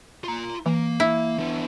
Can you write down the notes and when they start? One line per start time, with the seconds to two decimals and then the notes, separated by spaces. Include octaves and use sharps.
0.24 F4 A#5
0.66 E3 A#3
1.00 E4
1.39 D3 B3